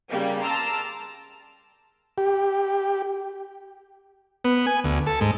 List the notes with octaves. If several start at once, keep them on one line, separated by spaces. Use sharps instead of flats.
C#3 G3 A#3
A5 A#5 C6 D6 E6 F6
G4
B3
G#5
D2
A4
G#2